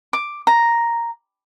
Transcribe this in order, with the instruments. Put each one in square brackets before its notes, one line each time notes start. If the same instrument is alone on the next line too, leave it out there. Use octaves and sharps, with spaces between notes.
[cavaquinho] D6
A#5